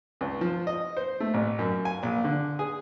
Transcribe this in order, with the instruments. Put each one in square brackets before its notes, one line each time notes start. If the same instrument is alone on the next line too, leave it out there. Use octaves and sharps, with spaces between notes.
[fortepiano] C#2
F3
D#5
C5
A3
A1
F#2
G#5
A#1
D3
G#4